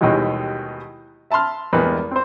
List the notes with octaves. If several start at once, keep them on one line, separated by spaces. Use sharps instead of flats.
D#2 B2 D#3 E3 G3 G#3
E5 A5 B5 C6 F6
E2 G2 G#3 A#3 B3 B5
C4 C5